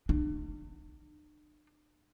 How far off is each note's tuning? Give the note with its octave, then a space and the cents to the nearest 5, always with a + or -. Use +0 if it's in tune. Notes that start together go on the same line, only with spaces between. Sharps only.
D4 +45